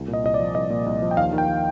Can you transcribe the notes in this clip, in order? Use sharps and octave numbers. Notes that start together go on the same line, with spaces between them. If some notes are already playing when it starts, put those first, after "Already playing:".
Already playing: C2
A#2
D#5
C2 D#5
D5
F3
C2 D#5
A#2
C2
F3
G5
D#2 F5
D#3
G5
D#3